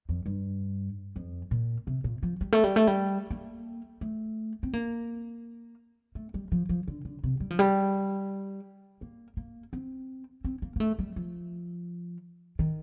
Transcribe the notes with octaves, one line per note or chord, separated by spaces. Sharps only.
F2
G2
F2
A#2
C3
A#2
F3
G3
A3
G3
A3
G3
A#3
A3
C4
A#3
A3
G3
F3
F3
D3
D3
C3
G3
F3
G3
A#3
A#3
C4
C4
A#3
A#3
A3
G3
F3
D#3